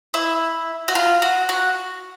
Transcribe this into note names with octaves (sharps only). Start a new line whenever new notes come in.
E4
F#4
F4
F#4
F#4